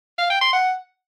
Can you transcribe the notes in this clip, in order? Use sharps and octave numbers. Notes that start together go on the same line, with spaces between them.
F5
G5
C6
F#5